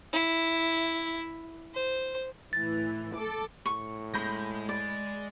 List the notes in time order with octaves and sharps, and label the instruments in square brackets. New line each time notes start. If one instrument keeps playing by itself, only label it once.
[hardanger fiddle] E4
C5
[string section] A2 E3 [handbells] A6
[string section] A4 D6
[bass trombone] A2 [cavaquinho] C#6
[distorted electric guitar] G#3 [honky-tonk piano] B5 G6 A#6
[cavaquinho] D5